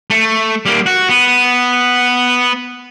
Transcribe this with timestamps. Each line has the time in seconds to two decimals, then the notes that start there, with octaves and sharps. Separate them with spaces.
0.10 A3
0.66 G3 A#3
0.86 F#4
1.09 B3